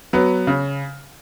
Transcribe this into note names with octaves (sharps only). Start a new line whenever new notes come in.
F#3 B3
C#3